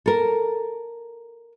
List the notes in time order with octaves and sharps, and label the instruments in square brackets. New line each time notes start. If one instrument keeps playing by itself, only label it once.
[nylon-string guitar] A4 A#4